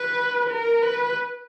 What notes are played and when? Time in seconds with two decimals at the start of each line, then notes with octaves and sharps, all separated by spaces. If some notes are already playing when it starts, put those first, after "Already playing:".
Already playing: B4
0.50 A#4
0.83 B4